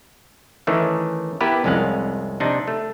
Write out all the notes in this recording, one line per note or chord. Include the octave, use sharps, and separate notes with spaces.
D#3 E3 A3 C#4
B3 E4 G4 A#4 B4
C2 F2 G#3 C#4 F5 F#5
C3 D4 D#4
A3